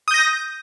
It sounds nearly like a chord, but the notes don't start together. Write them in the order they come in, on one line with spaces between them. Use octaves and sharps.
D#6 G6 A#6